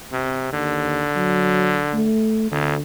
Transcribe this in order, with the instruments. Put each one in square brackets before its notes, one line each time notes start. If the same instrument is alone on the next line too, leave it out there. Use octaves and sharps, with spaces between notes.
[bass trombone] C3 [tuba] C4
[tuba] D#2 [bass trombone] D3
[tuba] F#3
A3
[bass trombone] D2 [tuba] D3